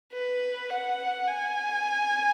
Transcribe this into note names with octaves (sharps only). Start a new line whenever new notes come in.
B4
F#5
G#5